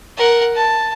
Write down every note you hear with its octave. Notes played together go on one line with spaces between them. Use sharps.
A#4 F#5
A5